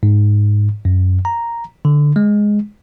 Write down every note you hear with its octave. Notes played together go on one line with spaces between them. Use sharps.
G#2
F#2
A#5
D3
G#3